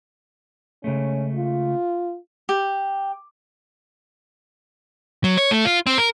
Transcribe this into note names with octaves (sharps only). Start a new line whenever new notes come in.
C#3 G#3 A3 C#4
F4
G4
F#3
C#5
A3
F4
C4
A#4